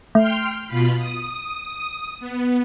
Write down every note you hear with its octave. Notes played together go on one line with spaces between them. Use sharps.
A3 G5 C6 F6
B2 F4 B5
D#6
B3